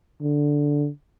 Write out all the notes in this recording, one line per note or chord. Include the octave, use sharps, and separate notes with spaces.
D3